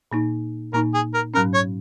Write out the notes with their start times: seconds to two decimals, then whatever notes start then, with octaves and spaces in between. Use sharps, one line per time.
0.11 A#2 A#3 D#4
0.73 A#2 A#3 D#4 A#4
0.94 G#4
1.14 A#4
1.34 G#2 F#3 C#4 A#4
1.54 C#5